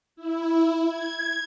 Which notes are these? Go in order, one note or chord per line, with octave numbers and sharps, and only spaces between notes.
E4
G#6